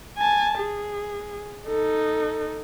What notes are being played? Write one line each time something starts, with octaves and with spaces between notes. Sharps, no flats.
G#5 A5
G#4
D#4 A4